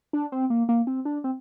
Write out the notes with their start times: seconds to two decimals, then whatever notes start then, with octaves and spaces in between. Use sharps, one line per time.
0.13 D4
0.32 C4
0.50 A#3
0.69 A#3
0.87 C4
1.05 D4
1.24 C4